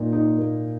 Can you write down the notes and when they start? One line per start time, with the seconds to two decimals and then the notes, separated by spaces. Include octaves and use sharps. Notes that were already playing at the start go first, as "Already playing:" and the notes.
Already playing: A#2 D#4
0.13 D#4
0.38 A#3